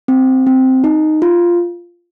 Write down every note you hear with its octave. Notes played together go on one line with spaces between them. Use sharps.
C4
C4
D#4
F4